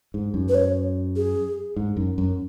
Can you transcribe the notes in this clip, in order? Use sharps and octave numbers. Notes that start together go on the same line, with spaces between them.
G#2
F#2
B4
C#5
G#4
G#2
F#2
F#2